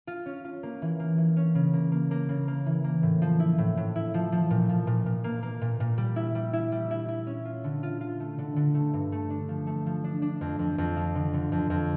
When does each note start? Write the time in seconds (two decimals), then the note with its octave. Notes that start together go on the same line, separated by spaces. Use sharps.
0.07 F4
0.26 C#4
0.44 F4
0.63 A#3
0.82 E3
1.00 A#3
1.18 E3
1.37 C#4
1.55 C#3
1.73 A#3
1.92 A#3
2.11 A#3
2.29 C#3
2.48 A#3
2.66 E3
2.84 A#3
3.03 A2
3.22 F3
3.40 E4
3.58 A2
3.77 A2
3.96 E4
4.14 F3
4.32 F3
4.50 A#2
4.69 F3
4.87 A#2
5.06 A#2
5.24 A#3
5.43 A#3
5.62 A#2
5.80 A#2
5.98 G3
6.16 E4
6.35 G3
6.53 E4
6.72 G3
6.91 E4
7.08 E4
7.27 C#4
7.45 F4
7.64 D3
7.83 F4
8.01 F4
8.20 A3
8.38 D3
8.56 D3
8.74 A3
8.93 G2
9.12 A3
9.30 D4
9.48 F3
9.67 A3
9.86 F3
10.04 D4
10.22 D4
10.41 F2
10.59 F2
10.78 F2
10.96 F3
11.15 D3
11.34 D3
11.52 F2
11.70 F2